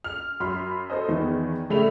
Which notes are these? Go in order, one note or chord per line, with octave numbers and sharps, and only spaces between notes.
F6
F#2 B5 C6
A4 C5 D#5
E2 D#3 B3
A#1 C#3 A3 E5 B5 F7